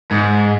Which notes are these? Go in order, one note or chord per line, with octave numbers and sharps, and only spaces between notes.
G#2